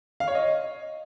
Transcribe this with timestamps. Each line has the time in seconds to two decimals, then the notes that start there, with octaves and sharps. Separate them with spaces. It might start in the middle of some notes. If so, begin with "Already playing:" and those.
0.20 F5
0.28 C#5
0.35 D#5